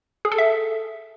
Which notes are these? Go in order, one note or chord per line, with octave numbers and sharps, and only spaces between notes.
G#4
A4
E5